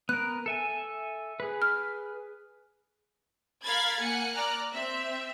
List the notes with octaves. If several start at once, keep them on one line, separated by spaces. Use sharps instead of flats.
B3 A#4 F#6
A4 E5 G#5
G#4 B4
F6
A#4 F5 B5 G#6 A6
A#3 F#5 G#5 C#7
D5 A#5 F6 F#6
C4 E5